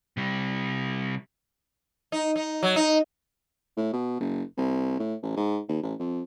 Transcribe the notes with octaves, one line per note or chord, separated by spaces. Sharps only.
C3 G3
D#4
D#4
F#3
D#4
A2
B2
F#1
C2
A2
A1
G#2
D#2
A1
F2